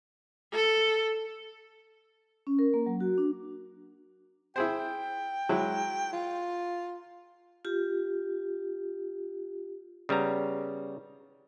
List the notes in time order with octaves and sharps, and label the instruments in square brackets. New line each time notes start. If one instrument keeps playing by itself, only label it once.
[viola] A4
[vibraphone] C#4
A#4
A#3
F#3
F#4
D4
[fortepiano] E4 G#4 C5 [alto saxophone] G5
[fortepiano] F#3 G#3 E4
[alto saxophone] F4
[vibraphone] F4 G4
[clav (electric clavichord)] C#3 G3 B3 A#5